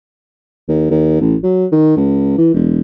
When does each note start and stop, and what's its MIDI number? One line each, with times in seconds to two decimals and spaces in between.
0.68 0.86 39
0.91 1.19 39
1.21 1.36 33
1.43 1.66 54
1.72 1.96 51
1.97 2.38 37
2.38 2.52 52
2.54 2.80 28